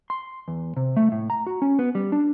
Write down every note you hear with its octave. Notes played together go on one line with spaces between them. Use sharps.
C6
E2
C3
A3
A2
A#5
F#4
C#4
B3
G3
D4